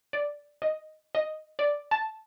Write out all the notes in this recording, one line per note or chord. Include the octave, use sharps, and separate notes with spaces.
D5
D#5
D#5
D5
A5